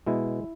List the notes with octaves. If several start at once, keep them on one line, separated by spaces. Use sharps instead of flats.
B2 G#3 E4